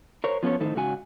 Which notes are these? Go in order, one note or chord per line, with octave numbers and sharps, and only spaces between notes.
A#4 C5 C#5
F3 B3 C#4 F4 A4 C#5
F2 A2 D#3 D#4 A4 C5
G#2 C#3 F#4 G#5